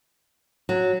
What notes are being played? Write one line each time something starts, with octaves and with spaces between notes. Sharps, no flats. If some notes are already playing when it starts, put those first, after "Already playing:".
F#3